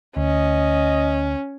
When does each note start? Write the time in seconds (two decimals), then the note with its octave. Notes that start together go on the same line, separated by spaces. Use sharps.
0.17 D2 C#4 D#5